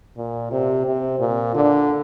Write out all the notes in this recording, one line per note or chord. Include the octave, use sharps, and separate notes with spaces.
A#2
C3
C3
A#2
D3